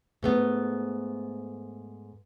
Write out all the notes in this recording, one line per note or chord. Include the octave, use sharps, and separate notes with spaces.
G#2 A3 B3